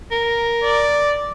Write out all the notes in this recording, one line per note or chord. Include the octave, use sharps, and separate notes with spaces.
A#4
D5